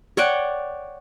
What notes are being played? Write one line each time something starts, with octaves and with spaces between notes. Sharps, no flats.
C#5 D5 F#5 G5